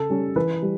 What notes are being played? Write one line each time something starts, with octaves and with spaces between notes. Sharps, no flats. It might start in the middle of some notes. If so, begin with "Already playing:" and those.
Already playing: C#3 A4
G3 C#4
E3 B4
G3